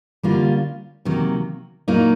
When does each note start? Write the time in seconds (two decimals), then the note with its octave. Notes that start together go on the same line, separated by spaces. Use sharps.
0.23 D3 G3 A#3 C#4 F4
1.05 C3 D#3 F#3 A#3
1.88 A#2 F#3 A#3 D#4